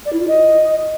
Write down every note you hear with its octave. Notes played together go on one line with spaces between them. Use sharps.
D5
E4
F4
D#5